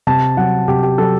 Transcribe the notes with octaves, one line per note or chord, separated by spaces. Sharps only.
C3 A5
F#3 F#5
C3 G4
G4
F#3 A4